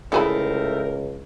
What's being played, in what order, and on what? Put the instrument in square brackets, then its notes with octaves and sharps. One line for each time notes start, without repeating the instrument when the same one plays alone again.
[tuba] C#2 [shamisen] D3 G#4 B5 [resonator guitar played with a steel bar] A3 C4 E4 [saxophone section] A#4